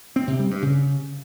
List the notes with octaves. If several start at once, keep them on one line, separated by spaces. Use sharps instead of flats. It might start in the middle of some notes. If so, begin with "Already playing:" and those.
C4
C3
G3
G2
C#3